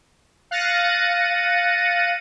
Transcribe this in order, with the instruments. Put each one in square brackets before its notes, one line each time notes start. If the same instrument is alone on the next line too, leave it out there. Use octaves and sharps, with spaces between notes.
[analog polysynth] F5 F#6 A6 A#6 C#7 D#7